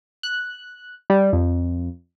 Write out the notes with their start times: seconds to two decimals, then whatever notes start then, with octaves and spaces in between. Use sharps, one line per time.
0.23 F#6
1.10 G3
1.33 F2